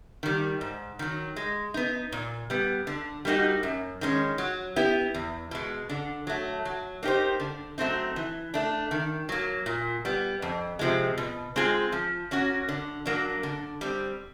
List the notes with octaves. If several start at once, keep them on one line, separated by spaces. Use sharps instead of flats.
D#3 G3
G#2
D#3 F#3
G#3
B3 D#4
A#2
G3 B3
D3
G3 A#3 D#4 F#4
F#2
D#3 G#3 C#4
F#3
B3 E4 G4
E2
B2 G#3
D3
F#3 A3
F#3
A#3 D#4 G4 C5
D3
F#3 A3 C4 D#4
E3
A3 D4
D#3
F#3 A#3
A#2
G3 B3
F2
C3 F3 G#3
B2
G#3 C4 F4 G#4
F3
A#3 C#4 F#4
D3
F#3 A#3 D4
D3
G3 C4